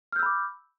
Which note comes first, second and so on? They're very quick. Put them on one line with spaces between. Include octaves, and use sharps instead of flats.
F6 G6 E6 B5 D6